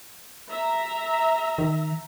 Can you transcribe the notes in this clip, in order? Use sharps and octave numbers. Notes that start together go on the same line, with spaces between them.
E5 A#5
D#3